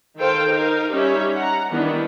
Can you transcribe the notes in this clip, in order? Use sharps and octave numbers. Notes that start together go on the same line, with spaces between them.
D#3 A4 C5 F5 G5
D#4 A#4 F5
G3 C#4 D#4 G4 C#5 E5
F#5 A#5
D#3 E3 G3 B3 D4 E4